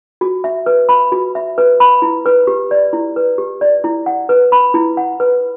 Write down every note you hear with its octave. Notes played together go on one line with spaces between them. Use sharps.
F#4
E5
B4
B5
F#4
E5
B4
B5
E4
B4
G4
D5
E4
B4
G4
D5
E4
F#5
B4
B5
E4
F#5
B4